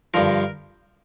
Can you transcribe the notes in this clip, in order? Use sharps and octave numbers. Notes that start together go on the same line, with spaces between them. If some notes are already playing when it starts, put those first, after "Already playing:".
G2 D3 F3 A#4